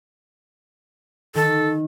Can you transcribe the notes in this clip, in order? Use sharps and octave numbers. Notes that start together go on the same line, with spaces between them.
D#3 A4